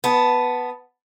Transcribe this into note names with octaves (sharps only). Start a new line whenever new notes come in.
B3 A5